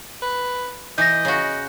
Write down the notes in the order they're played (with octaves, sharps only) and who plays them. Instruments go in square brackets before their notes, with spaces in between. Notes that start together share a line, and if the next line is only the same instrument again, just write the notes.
[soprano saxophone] B4
[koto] E3 [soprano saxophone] D#5 [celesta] G6 A#6
[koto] C#3 F#4